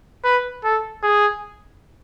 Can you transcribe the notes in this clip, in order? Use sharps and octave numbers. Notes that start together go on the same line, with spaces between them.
B4
A4
G#4